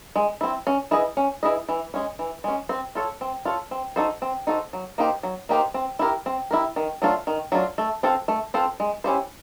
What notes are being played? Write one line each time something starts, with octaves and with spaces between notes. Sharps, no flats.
G#3
C4 E4
C#4
E4 G#4 B4 D#5
C#4
E4 G#4 B4 D#5
E3
G#3 C#4
E3
G#3 C#4
C4
F4 A4 C#5
C4
F4 A4 C#5
C4
D#4 F#4 A4 C5
C4
D#4 F#4 A4 C5
F#3
A#3 D#4 G4 C5
F#3
A#3 D#4 G4 C5
C4
E4 G4 A#4
C4
E4 G4 A#4
D#3
F#3 A3 D4 F4
D#3
F#3 A3 D4 F4
A3
C4 F4 A4 C5
A3
C4 F4 A4 C5
G#3
C#4 E4 G4 C5